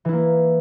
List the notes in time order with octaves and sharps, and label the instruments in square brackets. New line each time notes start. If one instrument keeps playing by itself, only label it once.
[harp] E3
E4
A#3